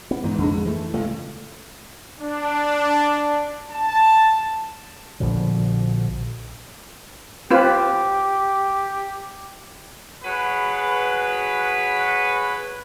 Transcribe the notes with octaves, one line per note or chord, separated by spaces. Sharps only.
B3
G#2 E3
F2 D3 G#3
E3 A3
C#2 A3
D4
A5
A#1 B2 D3 F3
C4 F4 G4 B4
F#3 F#4 G#4 B4